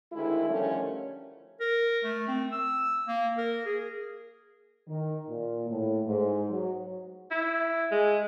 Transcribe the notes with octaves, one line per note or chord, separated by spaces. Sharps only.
D2 D#3 G#3 E4
D3 D#3 F3 G3 A3 C#4
A#4
A3
C4
E6
A#3
A#4
G#4
D#3
A#2
A2
G#2
F#3
E4
G#3